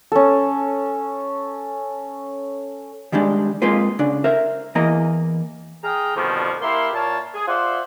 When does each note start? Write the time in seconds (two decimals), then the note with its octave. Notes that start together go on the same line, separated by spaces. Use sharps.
0.12 C#4 A4
3.12 D#3 G3 G#3 D4
3.62 G#3 A#3 C4 F4 B4
3.99 C#3 D4
4.24 A#4 C5 E5
4.75 E2 E3 A#3 D#5 A#5
5.84 G#4 G5 A#5 D#6 F6
6.15 F2 B2 D3 D#3 F3 G3
6.61 A#3 E4 G4 A#4 C6
6.94 A#2 A#4 C#5 A5
7.34 G#4
7.47 F4 C5 D5 E5 F#5 C6